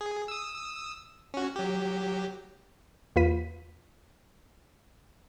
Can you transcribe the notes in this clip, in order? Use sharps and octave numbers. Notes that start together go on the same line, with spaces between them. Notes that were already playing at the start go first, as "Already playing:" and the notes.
G#4
D#6 E6
C#4 F#4
F#3 G4
E2 A#3 F4 B4 B6 D#7